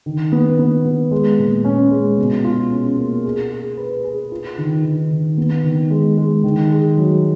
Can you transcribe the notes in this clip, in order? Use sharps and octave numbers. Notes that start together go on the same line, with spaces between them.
D#3
B3
B3
B3
G#3
A#2
C#4
G#3
B2
F4
C#4
A#3
G#4
G#4
B4
G#4
F4
D#3
D#3
D#3
B3
D#3
G#3
G#3
D#3
G#4
F#3